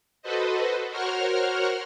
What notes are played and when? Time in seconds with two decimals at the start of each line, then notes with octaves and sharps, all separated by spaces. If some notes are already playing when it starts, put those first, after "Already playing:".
0.22 F#4 A4 B4 C5 D#5
0.89 F#4 A#4 C5 C#5 F#5 F6